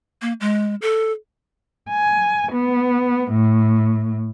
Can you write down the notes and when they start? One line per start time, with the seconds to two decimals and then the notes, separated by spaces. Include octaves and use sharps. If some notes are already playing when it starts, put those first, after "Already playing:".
0.22 A#3
0.40 G#3
0.82 A4
1.91 G#5
2.54 B3
3.32 A2